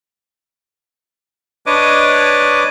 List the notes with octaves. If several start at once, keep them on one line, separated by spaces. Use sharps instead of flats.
D4 B4 C#5 D#5 D6